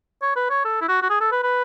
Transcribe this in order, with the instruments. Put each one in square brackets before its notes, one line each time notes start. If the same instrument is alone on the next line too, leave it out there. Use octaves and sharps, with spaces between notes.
[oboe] C#5
B4
C#5
A4
E4
F#4
F#4
G#4
A4
B4
B4